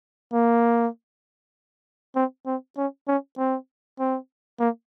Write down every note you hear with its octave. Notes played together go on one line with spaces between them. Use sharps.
A#3
C4
C4
C#4
C#4
C4
C4
A#3